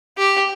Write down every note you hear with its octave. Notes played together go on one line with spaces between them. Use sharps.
G4